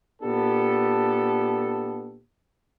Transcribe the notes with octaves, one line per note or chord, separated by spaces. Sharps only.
A#2 B3 D4 G4 A4